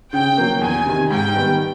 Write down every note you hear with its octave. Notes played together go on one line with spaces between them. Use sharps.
C#3 G5
F#3 A#3
E2 G#5
C3 D#3
G#2 G5
D#3 G3 B3